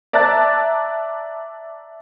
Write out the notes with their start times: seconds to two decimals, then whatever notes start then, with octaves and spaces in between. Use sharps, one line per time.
0.13 D5 E5 A5 A#5 F#6 A6